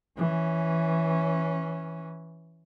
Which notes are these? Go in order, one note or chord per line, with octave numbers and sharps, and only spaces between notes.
E3 C#4